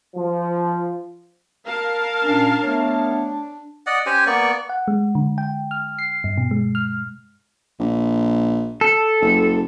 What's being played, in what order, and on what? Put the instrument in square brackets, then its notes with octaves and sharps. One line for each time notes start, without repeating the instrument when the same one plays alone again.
[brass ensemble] F3
[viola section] A#4 F5 A5
[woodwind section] A#2 C#4 [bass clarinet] D4
[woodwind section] A3 B3 C#5
[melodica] D5 D#5 F#5
C#4 G4 C5 G#5
A#3 B3 D5 C#6
[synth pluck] F#5
G#3
D3
G5
F6
C7
G2
B2
G#3
F6
[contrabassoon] A#1
[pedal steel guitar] A4
[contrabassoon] F#1